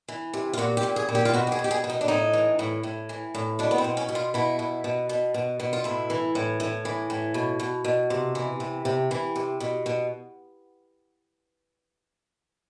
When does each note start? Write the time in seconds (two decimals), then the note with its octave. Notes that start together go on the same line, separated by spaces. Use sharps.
0.08 E3
0.34 C3
0.53 F4
0.58 A#2 F#4
0.77 G4
0.83 A#2
0.96 G#4
1.09 A#2
1.15 G4
1.25 F4
1.34 B2 F#4
1.47 G4
1.52 G#4
1.59 B2
1.64 G4
1.71 G#4
1.84 B2
1.90 D#4
2.01 D4
2.08 A2 D#4
2.33 E3
2.59 A2
2.83 A2
3.09 E3
3.35 A2
3.59 B2 D4
3.71 B3
3.78 C4
3.84 B2
3.97 C#4
4.09 B2
4.15 F4
4.34 B2 E4
4.59 B2
4.84 B2
5.09 B2
5.34 B2
5.60 B2
5.73 F4
5.84 A2 E4
6.10 E3
6.35 A2
6.60 A2
6.85 E3
7.10 A2
7.34 B2
7.60 B2
7.85 B2
8.10 C3
8.35 E3
8.60 C3
8.85 C3
9.11 E3
9.36 C3
9.60 B2
9.86 B2